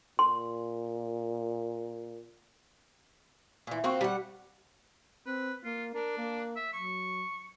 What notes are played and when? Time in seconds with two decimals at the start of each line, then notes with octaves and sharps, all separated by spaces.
0.19 A#2 C6
3.67 A#2 E3
3.84 A#3 C4 F4 F#4
4.01 G3 F#5
5.26 C4 B4
5.65 A#3 F4
5.94 D4 A#4
6.18 A#3
6.56 E5
6.73 F#3 C#6